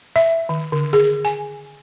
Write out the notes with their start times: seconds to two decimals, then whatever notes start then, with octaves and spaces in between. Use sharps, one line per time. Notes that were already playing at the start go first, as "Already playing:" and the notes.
0.16 E5
0.49 D#3
0.72 D3
0.93 G#4
1.25 G#5